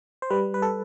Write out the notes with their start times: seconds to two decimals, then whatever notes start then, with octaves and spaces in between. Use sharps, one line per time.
0.22 C5
0.30 G3 B4
0.54 B4
0.62 A4